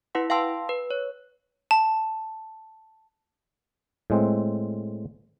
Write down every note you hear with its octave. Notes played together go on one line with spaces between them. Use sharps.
E4 B4 F#5 C6
F5 G5 A5 C6 E6
B4
C#5
A5
A2 G#3 C4